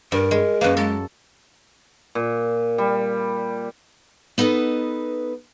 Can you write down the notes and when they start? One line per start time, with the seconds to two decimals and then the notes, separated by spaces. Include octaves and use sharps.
0.12 G2 A#4
0.31 G#3
0.61 F#2 A#3 B4
0.77 G#3 A4
2.15 A#2
2.78 G3
4.38 B3 D#4 A4 B4 D#5